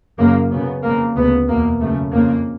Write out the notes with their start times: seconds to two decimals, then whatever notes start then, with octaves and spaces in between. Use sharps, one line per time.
0.19 F#2 C#3 A#3
0.51 F#2 C#3 B3
0.83 F2 C#3 A#3
1.16 D2 C#3 B3
1.48 E2 B2 A#3
1.80 F#2 C#3 A3
2.12 F2 C#3 A#3